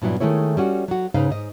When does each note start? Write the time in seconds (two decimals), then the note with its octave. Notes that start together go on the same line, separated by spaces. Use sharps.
0.02 G2 A#2 F#3 B3 E4
0.20 D#3 G#3 A3 E4 C#5
0.57 G3 C#4 F#4
0.88 F#3 F#4
1.14 G#2 C#3 D#4 B4 F5
1.30 G#2 D#5